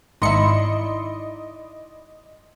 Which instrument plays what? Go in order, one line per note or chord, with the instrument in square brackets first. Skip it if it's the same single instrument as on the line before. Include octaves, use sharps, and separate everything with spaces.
[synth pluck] G#1 C#7 [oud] D#4 E4 [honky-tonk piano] D5 D#5 B5 [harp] C6